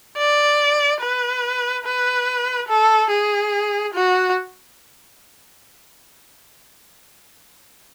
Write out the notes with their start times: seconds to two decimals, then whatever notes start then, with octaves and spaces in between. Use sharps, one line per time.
0.18 D5
1.01 B4
1.85 B4
2.68 A4
3.11 G#4
3.94 F#4